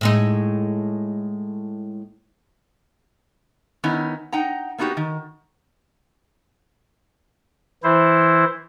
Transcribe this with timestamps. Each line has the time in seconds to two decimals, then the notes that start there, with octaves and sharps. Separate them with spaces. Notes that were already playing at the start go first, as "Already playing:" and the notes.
0.01 A2 G#3 D#4
3.84 D#3 B3 C#4 D#4 E4
4.32 D#4 F#5 G5 A#5
4.78 A#3 B3 D#4 F#4 G4
4.97 D#3
7.83 E3 E4 C5